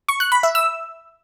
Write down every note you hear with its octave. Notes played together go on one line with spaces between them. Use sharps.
C#6
F#6
B5
E5
E6